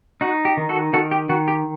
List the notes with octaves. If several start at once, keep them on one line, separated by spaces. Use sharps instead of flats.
D#4 F#4
G4
D#3
F#4 A4
D#3 F#4 A4
G4
D#3 F#4
G4